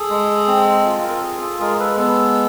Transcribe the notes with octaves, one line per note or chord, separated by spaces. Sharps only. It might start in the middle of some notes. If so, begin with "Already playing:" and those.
Already playing: G#4 A4
G#3
C4
F4
A#4
A4
G#4
A4
G#3 G#4 A#4
A4 B4
B3 A4